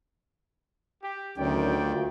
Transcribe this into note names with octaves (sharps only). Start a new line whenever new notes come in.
G4
D2 D#3 F#3 C#4 D5 G5
A#3 F4 F#4